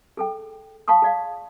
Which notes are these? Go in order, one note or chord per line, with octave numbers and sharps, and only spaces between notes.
G#4 A4 G5
F5 A5 B5 C#6 D#6
G#4 D5 F5